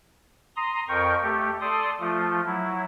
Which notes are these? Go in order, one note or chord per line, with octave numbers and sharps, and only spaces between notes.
A#5 C6 D#6
F2 A#4 G5 C#6
A3 G4
A4 D5 C6 D#6
F3 A3 F4
F#3 E4